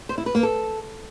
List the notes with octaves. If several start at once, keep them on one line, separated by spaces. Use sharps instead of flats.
C5
E4
B4
A#3
A4